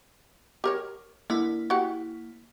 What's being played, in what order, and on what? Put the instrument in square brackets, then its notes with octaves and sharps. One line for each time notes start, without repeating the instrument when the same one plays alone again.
[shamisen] G4 A#4 C#5
[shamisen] D3 [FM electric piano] A#3 E4
[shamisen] F#4 G4 F#5